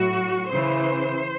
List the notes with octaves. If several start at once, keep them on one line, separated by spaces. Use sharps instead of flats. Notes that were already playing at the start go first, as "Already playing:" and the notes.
Already playing: A2 F#3 F#4
C#3 E3 C5